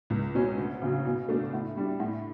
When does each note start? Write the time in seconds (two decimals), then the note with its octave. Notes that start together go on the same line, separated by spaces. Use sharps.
0.10 C#2
0.35 B2 F#3 C#4
0.57 D2
0.82 C#3 F#3
1.05 B2
1.29 F#3 A3 D4 F#4
1.53 A2
1.77 G3 D4
2.00 A2